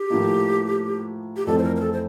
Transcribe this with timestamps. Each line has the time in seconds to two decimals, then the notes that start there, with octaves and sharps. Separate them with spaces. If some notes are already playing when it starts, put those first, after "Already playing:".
Already playing: G4
0.10 A2 F3 A#3
1.37 G4
1.46 F2 E3 A3 C4 A4
1.58 C5
1.63 A#4
1.76 A#4
1.81 A4
1.93 C5